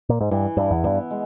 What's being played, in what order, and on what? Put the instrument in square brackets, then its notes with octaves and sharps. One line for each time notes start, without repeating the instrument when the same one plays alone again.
[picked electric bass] A#2
G#2
[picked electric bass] G2 [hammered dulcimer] E3
[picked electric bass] G2 [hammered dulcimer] E4
[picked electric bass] E2
[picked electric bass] G2 [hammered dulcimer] B3
[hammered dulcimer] G#3